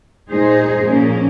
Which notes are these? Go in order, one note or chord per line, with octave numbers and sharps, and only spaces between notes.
A#2 G#3 D#4 G#4 C5
A#2 F3 A#3 C#4